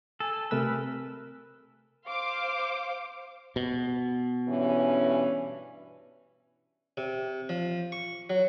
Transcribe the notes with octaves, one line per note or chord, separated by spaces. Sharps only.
A4 G#5
C3 A3 A#4 B4 E6
C5 F5 D6
B2
G2 E3 C#4
C3
F3
C#6
F#3